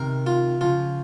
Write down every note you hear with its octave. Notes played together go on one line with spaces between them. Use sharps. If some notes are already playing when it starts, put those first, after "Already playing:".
Already playing: C3 D#3 A#4
F4
C#3 F3 F4